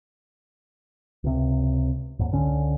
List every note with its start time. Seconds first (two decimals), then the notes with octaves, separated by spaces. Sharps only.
1.24 C#2 C3
2.19 D#2 G#2
2.32 C#2 D3 C#4